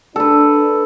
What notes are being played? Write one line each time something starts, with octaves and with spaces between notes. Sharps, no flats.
D4 A4 B4